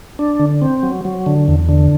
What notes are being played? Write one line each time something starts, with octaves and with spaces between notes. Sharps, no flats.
D4
D3
C4
F#3
F#3
D3
E2
D3